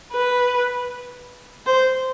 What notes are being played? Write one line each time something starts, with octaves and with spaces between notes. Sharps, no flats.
B4
C5